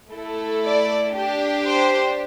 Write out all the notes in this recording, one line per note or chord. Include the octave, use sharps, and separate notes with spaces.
A3 E4 A4
D5
D4 G4
C5